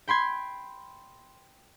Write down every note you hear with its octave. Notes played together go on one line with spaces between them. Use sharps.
G5 B5 C6 G#6